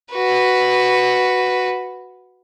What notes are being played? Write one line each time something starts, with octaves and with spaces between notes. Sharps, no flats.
F#4 B4